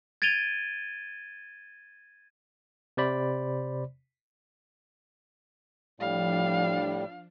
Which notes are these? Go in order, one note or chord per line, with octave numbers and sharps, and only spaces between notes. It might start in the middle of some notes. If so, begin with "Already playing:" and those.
G#6 A6 D7 D#7 F7 G7
C3 C5 D5 B5
A2 F3 G3 D4 F5